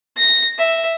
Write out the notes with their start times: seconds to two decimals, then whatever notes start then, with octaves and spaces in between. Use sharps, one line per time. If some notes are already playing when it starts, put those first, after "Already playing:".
0.17 A#6
0.58 E5